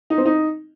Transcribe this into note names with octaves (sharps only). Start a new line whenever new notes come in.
D#4
C4
D#4